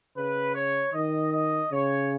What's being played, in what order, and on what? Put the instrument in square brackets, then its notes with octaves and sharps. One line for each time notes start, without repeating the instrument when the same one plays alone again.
[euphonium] C#3 [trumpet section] B4
[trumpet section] C#5
[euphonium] D#3 [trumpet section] D#5
[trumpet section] D#5
[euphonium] C#3 [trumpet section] C#5